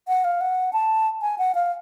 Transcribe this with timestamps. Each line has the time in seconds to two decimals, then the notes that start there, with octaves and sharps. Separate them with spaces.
0.08 F#5
0.24 F5
0.41 F#5
0.73 A5
1.22 G#5
1.38 F#5
1.55 F5